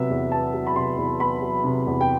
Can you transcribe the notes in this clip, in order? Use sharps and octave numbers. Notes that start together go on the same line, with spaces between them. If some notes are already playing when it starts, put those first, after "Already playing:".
Already playing: C3 F#3 B3 E5
E2
B3 A5
F#3
B5
C3 C6
E2
B3 B5
F#3
C3
E2
G5